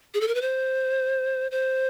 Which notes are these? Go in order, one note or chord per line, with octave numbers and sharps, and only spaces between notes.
G#4
A4
A#4
B4
C5
C5